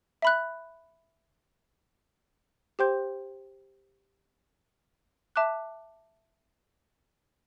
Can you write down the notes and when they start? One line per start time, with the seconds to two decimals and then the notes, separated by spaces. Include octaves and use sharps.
0.22 E5 B5 F#6
2.79 G4 C5 G5 C6 G6
5.36 E5 A5 D6 F#6